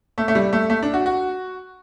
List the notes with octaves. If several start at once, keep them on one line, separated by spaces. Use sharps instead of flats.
A3
A3
G3
A3
A3
D4
F#4
F#4